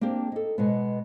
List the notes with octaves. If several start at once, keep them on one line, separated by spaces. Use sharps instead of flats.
A#3 C4 D4 G4
D#4 A4
B2 G#3 B3